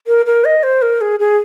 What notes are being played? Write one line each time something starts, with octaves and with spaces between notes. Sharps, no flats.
A#4
A#4
D#5
C5
A#4
G#4
G#4